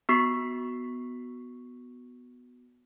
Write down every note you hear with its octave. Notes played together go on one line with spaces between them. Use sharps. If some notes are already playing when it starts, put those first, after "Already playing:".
B3 F#4 C#6 B6 C7